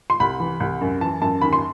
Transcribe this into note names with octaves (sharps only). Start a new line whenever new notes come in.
C6
C2 B5
E3
C2
F#2
E3 A5
F#2 A5
D#2 B5
C6